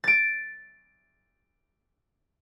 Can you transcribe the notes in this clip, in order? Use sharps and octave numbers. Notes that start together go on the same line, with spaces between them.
A6 D7